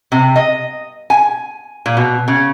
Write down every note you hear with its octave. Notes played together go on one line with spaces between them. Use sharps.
C3
D#5
G#5
A#2
B2
C#3